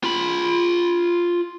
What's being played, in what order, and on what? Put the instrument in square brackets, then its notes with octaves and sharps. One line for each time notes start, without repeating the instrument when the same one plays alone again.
[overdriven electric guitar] F4 B5